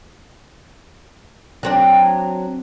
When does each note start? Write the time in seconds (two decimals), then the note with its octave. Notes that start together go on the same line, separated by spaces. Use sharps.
1.63 F#3 C4 D4